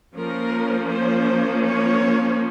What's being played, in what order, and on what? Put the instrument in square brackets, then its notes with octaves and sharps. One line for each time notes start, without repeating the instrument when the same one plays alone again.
[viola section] F3 A#3 C#4 A#4
C5
C#5